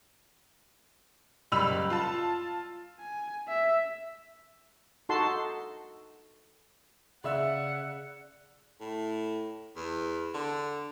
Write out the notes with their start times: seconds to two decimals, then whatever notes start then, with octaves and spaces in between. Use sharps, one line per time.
1.52 F#1 G3 B5 E6 F7
1.90 F4 A5
2.99 G#5
3.48 E5
5.09 D#4 F#4 A4 F#5 A5 C6
7.24 C#3 D5 E5 F#5 E6
8.80 A2
9.76 E2
10.34 D3